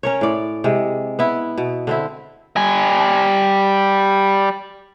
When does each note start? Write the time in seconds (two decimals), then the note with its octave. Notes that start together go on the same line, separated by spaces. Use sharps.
0.03 C#4 A#4 C#5
0.21 A2 D5
0.64 C3 G#3
1.19 B3 E4
1.58 B2
1.87 D3 C4 E4
2.56 G3 G#5